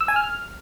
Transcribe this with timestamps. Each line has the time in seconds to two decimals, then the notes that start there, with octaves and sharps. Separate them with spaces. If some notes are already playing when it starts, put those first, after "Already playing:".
0.01 E6
0.08 G#5
0.16 F6